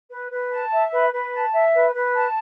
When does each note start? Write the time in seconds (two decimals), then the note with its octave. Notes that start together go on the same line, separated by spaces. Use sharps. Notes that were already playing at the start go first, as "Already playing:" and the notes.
0.10 B4
0.31 B4
0.51 A5
0.72 E5
0.92 B4
1.12 B4
1.33 A5
1.53 E5
1.74 B4
1.94 B4
2.15 A5